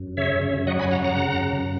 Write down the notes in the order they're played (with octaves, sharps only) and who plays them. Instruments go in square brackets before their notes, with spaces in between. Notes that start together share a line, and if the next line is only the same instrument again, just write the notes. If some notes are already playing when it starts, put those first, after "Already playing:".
Already playing: [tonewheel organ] F#2
C#3 C#5 E5
F#2
F#3 D#5 F#5
G#5 B5
F#2 F#5 A#5
F#5 A#5
C#3
F#2